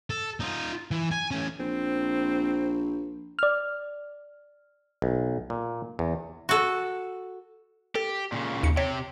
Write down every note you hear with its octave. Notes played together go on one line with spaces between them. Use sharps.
A4
D#4 F4
E3
G#5
A2 C#4
A#1 C4
D5 F6
B1
A#2
E2
F#4 A4
G4 A4
A#2 C#3
D#2 C#7
C3 G4 C#5